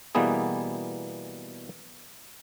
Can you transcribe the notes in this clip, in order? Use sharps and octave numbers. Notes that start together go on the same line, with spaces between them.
B2 E3 G3 A#3 B3 G#4